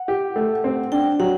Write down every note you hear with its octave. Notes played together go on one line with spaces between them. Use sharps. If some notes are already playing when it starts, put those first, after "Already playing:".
Already playing: F#5
G4
A3
C4
D4 G5
F#3 F#5